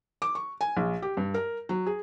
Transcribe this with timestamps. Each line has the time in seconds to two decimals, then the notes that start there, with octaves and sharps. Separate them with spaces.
0.22 D6
0.35 C#6
0.61 G#5
0.77 A#1
1.02 G4
1.17 G2
1.34 A#4
1.69 F#3
1.86 G#4